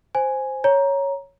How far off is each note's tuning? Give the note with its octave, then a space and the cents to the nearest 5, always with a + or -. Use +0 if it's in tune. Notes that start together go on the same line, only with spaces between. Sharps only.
C5 +0 G#5 +0
C#5 +0 A#5 +10